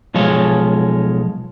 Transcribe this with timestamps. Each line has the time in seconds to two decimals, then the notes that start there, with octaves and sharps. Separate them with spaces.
0.14 B1 F3 G#3 C#5